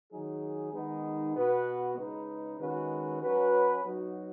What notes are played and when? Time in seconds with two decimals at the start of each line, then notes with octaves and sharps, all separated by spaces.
0.12 D#3 F#3 D#4 G#4
0.73 D#3 G#3 B3 D#4
1.35 B2 B3 F#4 B4
1.97 C#3 G#3 D#4 B4
2.60 D#3 G#3 C#4 F#4 B4
3.22 F#3 C#4 F#4 B4
3.84 F#3 B3 D#4 F#4